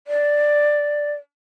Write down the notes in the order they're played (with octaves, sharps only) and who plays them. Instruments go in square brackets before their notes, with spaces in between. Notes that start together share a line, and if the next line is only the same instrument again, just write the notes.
[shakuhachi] D5